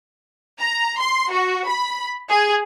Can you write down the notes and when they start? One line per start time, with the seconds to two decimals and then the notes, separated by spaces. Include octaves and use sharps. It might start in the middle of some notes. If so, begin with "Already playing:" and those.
0.61 A#5
0.99 C6
1.31 F#4
1.67 B5
2.29 G#4